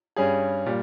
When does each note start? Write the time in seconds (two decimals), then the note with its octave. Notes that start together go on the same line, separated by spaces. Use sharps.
0.16 G2 G3 C#4 G#4
0.66 A#2 G3